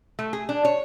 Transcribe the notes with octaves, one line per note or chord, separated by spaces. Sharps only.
A3
G#4
D4
C#5